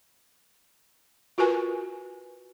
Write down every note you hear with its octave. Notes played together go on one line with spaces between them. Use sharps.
F4 F#4 A#4 B4 G#5